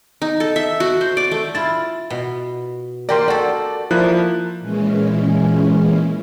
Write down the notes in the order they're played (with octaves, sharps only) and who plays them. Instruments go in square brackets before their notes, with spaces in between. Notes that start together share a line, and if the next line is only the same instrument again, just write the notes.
[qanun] D#4
A4
E5
F#4
C5
D5
A3
[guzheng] E4 F4 [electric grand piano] A6
[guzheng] B2
[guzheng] A#3 G4 A#4 [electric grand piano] D5 G5 C6
[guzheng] F#4 A4 [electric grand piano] D5
[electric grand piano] F3 E4 F#6 [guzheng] A#3
[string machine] A#2 E3 G#3 C#4